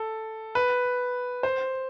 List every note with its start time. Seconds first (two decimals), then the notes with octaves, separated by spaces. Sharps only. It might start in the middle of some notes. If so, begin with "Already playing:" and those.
Already playing: A4
0.55 B4
1.43 C5